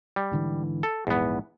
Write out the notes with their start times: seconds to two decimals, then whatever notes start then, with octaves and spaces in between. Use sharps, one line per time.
0.16 G3
0.32 G#2 D3 E3
0.83 A4
1.07 A#1 E2 G#2 B3